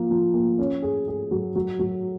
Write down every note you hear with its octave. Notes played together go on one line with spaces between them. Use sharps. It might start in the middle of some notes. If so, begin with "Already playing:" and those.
Already playing: F3 A#3
F3
A#3
C#4
G#4
G#4
F#3
F#3
F#3